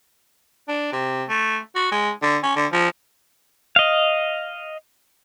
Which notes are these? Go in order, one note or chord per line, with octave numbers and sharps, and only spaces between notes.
D4
C3
A3
F#4
G#3
D3
C#4
D3
F3
D#5 F5